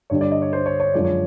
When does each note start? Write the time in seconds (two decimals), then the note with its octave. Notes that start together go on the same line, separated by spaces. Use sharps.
0.10 G2 D3 G3 C#5
0.21 D5
0.31 D#5
0.42 C#5
0.53 C5
0.66 C#5
0.80 C#5
0.94 F#2 D3 F3 G#3 D5
1.04 C#5